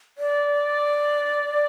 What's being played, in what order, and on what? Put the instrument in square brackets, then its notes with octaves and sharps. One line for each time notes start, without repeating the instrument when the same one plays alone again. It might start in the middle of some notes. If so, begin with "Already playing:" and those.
[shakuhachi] D5